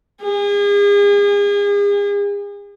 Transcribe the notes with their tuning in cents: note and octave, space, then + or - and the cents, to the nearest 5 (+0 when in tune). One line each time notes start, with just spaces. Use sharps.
G#4 -40